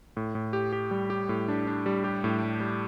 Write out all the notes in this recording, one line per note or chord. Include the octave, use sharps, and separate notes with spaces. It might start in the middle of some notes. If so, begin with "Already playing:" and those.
A2
A2
G4
G4
G3
G4
A2
D4
D4
G3
G4
A2
G3
G3